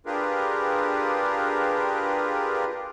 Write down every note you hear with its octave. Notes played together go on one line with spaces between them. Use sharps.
D4 F4 G4 G#4 A#4 B4